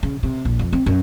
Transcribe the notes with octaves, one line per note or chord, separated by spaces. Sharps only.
C#3
C3
A#1
F2
C4
F#2